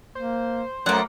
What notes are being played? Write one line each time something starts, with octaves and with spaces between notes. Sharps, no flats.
A#3 C5
F#2 A3 A#3 F#5